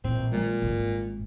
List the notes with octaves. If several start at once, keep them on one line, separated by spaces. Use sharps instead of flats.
A#1 A2 E3 C4
A#2 F3 G3 G#3
G#1 G#2